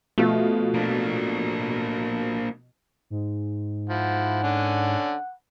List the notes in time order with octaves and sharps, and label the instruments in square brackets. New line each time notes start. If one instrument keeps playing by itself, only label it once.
[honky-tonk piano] B2 F3 F4 [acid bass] A3
[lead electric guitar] A#3 D4
[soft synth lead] G#2
[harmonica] F3 E4 [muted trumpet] F#5
[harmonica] D3 C#4 D4